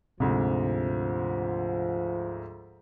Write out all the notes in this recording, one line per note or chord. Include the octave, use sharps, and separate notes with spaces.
D2 G#2 C3 F3